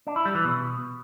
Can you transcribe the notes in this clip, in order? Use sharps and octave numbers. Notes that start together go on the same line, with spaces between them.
D4
E4
G3
E3
B2